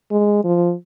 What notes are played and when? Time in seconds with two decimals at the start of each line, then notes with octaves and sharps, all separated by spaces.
0.11 G#3
0.44 F3